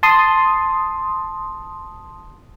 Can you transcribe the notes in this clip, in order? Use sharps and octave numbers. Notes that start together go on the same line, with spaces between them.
A5 C6 D#6